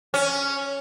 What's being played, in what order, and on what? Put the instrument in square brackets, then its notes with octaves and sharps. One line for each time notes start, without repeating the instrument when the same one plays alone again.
[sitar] C#4